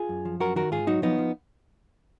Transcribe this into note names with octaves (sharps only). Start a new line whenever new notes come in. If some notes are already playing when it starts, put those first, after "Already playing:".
Already playing: F4 G#4
F#2
F3
F#2 F#4 A#4
D#3 F#4 A#4
G#2 F4 G#4
F#3 D#4 F#4
F3 B3 D#4
F3